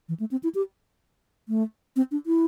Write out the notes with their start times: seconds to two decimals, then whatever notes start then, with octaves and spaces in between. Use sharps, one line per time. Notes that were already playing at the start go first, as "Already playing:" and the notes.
0.09 E3
0.20 A3
0.31 C4
0.43 E4
0.55 G4
1.49 A3
1.96 C4
2.11 D4
2.26 E4